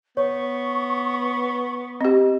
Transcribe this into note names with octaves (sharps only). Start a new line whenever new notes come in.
B3 C#5 C#6
C4 G4 D#5